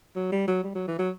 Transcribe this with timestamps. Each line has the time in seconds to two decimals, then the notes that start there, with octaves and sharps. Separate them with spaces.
0.16 F#3
0.32 G3
0.48 F#3
0.64 G3
0.75 F#3
0.88 E3
0.99 F#3